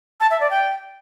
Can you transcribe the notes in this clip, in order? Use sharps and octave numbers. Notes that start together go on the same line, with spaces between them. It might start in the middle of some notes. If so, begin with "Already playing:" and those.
A5
E5
D5
G5